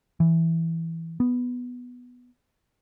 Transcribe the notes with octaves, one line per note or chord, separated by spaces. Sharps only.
E3
B3